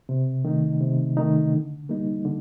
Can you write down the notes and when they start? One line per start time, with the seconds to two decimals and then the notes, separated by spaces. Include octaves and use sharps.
0.09 C3
0.45 D#3 A3 D#4
0.81 C3
1.17 D#3 A3 D#4
1.53 D3
1.89 G3 A#3 D#4
2.25 D3